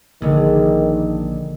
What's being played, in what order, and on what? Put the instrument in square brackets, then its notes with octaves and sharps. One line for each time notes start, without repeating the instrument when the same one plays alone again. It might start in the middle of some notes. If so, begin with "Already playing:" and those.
[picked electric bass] A#1 [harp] D3 G#3 [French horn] D#3